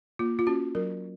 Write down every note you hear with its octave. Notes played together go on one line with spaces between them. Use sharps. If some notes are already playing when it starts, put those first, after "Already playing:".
A#3 F4
F4
C#4 F#4
F#3 A#4